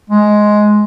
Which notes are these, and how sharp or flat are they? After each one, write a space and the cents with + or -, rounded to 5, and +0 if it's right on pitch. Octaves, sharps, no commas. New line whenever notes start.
G#3 +10